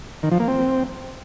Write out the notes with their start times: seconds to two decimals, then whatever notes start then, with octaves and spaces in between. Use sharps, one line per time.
0.23 D#3
0.31 F3
0.40 A#3
0.48 C4